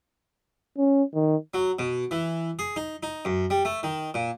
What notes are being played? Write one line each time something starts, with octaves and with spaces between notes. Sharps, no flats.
C#4
D#3
F#3
B2
E3
G#4
D#4
D#4
F#2
G3
A3
D#3
A#2